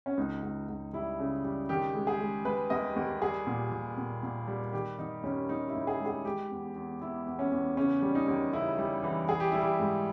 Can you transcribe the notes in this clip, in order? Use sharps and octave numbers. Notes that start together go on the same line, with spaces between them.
C#4
C#2 D#4
C#2
C#2
G3 E4
C#3
G3
D#3 G4
G#3
G#4
G#3
G#3 B4
D#2 D#5
D#2
G3 G#4
A#2
A#2
A#2
A#2
G3
D#3 G4
D#3 D#4
D#2 C#4
D#2 D#4
E4
D#2
G#4
G#3
G#4
G#3 G4
E2
E2
E2 E4
E2
C#4
E2
C#3 C#4
G3
D#4
D#2
C#3 E4
G3
E3
G3 G#4
G4
G3 E4
G4
G#2